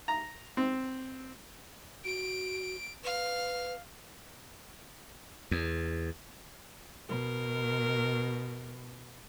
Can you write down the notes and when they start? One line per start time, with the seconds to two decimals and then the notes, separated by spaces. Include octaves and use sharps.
0.08 A#5
0.57 C4
2.05 F#4 D7
3.04 B4 F5
5.51 E2
7.09 B2 A#4